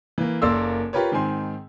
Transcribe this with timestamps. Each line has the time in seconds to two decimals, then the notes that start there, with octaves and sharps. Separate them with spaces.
0.18 E3 A#3
0.42 F#1 A#3 A4 D5 C6 E6
0.93 F4 G4 A#4 B4 C#5
1.12 G#2 D#3 C4 G#5 C6